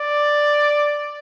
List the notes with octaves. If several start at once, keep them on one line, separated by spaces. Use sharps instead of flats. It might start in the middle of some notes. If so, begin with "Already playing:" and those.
Already playing: D5